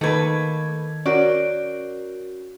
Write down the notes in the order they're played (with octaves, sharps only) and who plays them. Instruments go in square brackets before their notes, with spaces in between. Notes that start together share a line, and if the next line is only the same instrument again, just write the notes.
[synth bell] D#3 G#6 [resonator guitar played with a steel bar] A3 A#3 B4
[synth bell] C#4 F#4 A#4 [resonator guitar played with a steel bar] D5